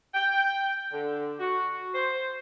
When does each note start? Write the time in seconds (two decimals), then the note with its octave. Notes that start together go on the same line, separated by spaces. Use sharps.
0.14 G5
0.93 D3
1.40 F#4
1.95 C5